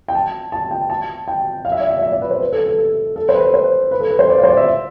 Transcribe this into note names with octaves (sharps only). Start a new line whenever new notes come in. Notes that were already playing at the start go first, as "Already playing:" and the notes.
G5
A5
A5
G5
A5
G5
F5
E5
D5
E5
D5
E5
D5
B4
C5
B4
A4
A4
A4
A4
C5
B4
C5
B4
A4
B4
C5
D5
F5
C5
D5
E5